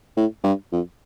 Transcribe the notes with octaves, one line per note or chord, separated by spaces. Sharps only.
A2
G2
F2